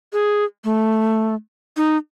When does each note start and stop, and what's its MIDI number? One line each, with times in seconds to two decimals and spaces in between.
0.13 0.44 68
0.64 1.34 57
1.77 1.97 63